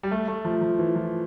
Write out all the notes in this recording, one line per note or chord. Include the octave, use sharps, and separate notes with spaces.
G3
A3
A3
F3
F3
E3
F3